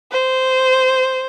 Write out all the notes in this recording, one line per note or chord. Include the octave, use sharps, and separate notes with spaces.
C5